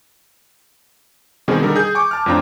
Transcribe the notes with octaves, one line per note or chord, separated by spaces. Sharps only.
B2 D#3 G3 C4 G#4
D3 G3 D#4 A4 A#4
G#4 G6
G#5 C#6 D6
A5 F6
F2 A2 C4 D4 F4 A#5